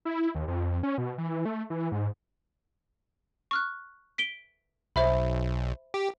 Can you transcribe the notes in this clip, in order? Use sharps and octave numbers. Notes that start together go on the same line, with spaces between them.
E4
D#2
F2
C#4
B2
E3
A3
E3
G#2
C#6 F6 F#6
B6 D7 G7
B1 C5 E5 B5
G4